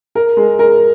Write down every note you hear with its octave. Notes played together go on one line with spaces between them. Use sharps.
A#4
G#3
A#4